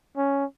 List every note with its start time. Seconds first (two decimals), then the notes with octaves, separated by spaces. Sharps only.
0.17 C#4